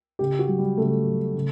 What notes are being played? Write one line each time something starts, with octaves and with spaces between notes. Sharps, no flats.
C#3 G4
F#4
F#3
G3
C#3 A3
F#3
C#3